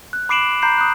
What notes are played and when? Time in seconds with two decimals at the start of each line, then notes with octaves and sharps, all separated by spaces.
0.13 F#6
0.29 B5 D6 C7 D7 E7 F#7
0.62 A#5 B5 G6 C7
0.78 D#6 F#6